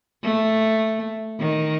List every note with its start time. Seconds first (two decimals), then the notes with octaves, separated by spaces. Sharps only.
0.23 A3
1.40 D#3